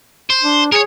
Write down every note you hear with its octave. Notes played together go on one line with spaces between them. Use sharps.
C5
D4
G#4 A#4 C#5